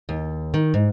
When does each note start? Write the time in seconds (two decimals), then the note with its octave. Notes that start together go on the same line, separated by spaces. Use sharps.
0.09 D#2
0.54 D#3
0.74 G#2